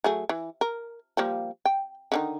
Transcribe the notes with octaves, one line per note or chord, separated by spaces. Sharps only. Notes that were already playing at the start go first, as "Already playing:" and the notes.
F#3 A3 G#4
E3
A#4
F3 G3 A#3
G5
D3 D#3 D#4